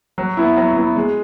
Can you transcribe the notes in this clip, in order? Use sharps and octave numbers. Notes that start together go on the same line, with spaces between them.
F#3
B3 E4
F#3
B3 E4
G#3